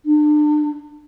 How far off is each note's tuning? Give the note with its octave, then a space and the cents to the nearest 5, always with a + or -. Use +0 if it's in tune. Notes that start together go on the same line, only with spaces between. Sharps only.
D4 +35